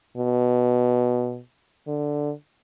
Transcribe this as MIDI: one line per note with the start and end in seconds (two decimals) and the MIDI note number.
0.17 1.39 47
1.87 2.32 50